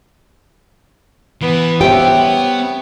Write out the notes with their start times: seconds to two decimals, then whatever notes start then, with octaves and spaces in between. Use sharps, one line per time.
1.41 E3 B3
1.81 B3 G4 C5 C#5 E5 G5